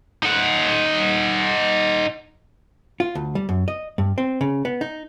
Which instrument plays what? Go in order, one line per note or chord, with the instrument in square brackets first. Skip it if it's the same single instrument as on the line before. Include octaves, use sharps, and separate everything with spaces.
[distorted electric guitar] D#4 F#5
[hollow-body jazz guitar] F4
D2
G3
F#2
D#5
G2
C4
C#3
B3
D#4